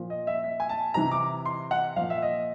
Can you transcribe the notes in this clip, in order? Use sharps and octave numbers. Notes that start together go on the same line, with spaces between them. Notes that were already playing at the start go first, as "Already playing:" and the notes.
Already playing: A#2 F3
D#5
E5
E5
G#5
A5
C3 E3 A#5
D6
C6
F#5
A#2 F3 F5
E5
D#5